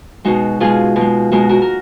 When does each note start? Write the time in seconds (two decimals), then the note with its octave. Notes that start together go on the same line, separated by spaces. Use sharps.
0.24 B2 G#3 D#4 F#4
0.60 B2 G#3 F4 G#4
0.96 B2
1.01 G#3
1.32 B2 G#3 F#4 A#4
1.49 F#4 A#4
1.62 A#4